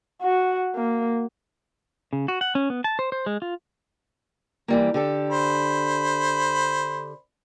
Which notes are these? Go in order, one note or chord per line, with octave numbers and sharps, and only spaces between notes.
F#4
A#3
C#3
F#4
F#5
C#4
B3
A5
C5
C5
G#3
F4
E3 G3 A#3
D3 G4 A4
C5 B5